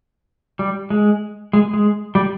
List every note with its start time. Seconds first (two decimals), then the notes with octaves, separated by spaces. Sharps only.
0.59 G3
0.90 G#3
1.53 G#3
1.74 G#3
2.15 G3